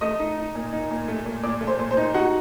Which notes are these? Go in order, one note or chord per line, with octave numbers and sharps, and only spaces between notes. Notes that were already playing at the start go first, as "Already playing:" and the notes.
A3 D#5 D#6
D#4
D#4
A#2
D#4
A#2
A3
A#2
A#2 D5 D6
A3
C5 C6
A#2
C5 C6
D#4
D#4 F#4 F#5